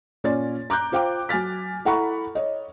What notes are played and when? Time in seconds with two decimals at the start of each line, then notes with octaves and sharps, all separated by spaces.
0.24 A#2 C#4 F4 C#5 D5 A6
0.70 A#5 D6 F#6 G6
0.92 F4 C5 F5 G5 A#5 D6
1.29 F#3 G#5 F6 A6 B6
1.85 E4 A4 F#5 A#5 B5 C#6
2.35 C#5 D#5